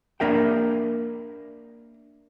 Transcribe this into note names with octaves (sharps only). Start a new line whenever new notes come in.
A#3 D4 A#4 E5 G5